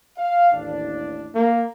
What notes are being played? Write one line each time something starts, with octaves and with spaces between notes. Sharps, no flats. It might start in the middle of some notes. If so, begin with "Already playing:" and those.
F5
A1 D#2 D4
A#3